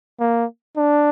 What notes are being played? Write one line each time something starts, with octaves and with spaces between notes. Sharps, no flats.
A#3
D4